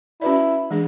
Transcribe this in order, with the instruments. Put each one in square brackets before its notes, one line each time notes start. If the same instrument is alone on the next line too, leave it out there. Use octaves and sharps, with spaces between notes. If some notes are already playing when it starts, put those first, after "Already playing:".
[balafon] C#4 F#4 B4 D5 [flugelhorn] E4
[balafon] E3 G#3 D4 G#4